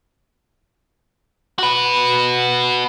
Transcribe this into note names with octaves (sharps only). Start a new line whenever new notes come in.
F#4 B4